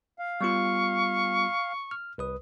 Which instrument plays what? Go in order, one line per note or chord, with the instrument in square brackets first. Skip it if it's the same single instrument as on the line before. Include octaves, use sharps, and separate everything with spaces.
[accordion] F5
[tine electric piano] G3 B3 F4 [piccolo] C#6
[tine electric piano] F6
C2 B4 D#6